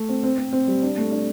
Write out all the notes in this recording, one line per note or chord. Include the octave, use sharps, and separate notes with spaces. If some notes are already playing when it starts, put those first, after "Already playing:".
Already playing: A3
C4
C4
C4
C4
G3
D4
A3
D4